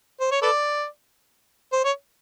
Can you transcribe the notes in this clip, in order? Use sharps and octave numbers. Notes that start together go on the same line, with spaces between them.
C5
C#5
A4 B4 D5
C5
C#5